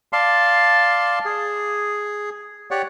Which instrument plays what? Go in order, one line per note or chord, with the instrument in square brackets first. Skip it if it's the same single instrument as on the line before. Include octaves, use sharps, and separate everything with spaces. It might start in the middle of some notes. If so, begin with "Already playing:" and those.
[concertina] D5 F5 A5 C6
G#4
G4 C#5 D5 F#5